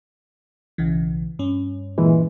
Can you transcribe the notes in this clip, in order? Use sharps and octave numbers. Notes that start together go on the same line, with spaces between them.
B1 C#3 E3
G2 C#4
A#2 E3 G#3